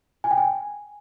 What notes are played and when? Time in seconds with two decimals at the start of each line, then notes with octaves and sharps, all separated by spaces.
0.24 G#5
0.31 G5
0.38 G#5